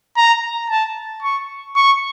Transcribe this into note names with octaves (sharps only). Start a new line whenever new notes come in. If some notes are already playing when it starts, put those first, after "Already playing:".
A#5
A5
C#6
C#6